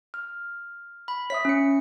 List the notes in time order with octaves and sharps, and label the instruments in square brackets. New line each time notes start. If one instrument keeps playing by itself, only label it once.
[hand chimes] F6
[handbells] B5
[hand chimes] C#5 E5 D#6 [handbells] B6
[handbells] C#4 C#7